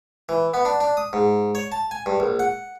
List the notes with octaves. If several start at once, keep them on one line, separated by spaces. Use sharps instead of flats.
E3
B3
D4
D4
D#6
G#2
C#5
A5
G#5
G2
A#1
F#5